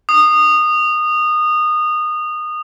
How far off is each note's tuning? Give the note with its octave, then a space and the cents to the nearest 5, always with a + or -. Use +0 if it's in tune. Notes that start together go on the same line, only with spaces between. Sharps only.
D#6 -20